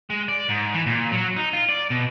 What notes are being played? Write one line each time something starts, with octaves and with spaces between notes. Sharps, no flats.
G#3
D5
G#2
E3
A#2
F#3
D#4
F4
D5
B2